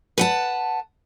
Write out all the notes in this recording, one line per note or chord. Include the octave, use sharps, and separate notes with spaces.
B4 F#5 A5